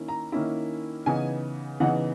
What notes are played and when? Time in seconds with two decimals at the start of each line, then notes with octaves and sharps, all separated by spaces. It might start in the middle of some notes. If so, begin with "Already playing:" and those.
Already playing: D#3 A#3 C#4 E4
0.08 A#5
0.32 D#3 A#3 C#4 E4
1.06 C#3 E3 B3 D#4 G#5
1.80 C#3 E3 B3 D#4 F#5